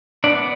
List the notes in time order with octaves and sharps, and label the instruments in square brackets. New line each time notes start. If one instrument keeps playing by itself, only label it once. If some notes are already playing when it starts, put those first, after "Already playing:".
[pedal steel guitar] B3 D4 D5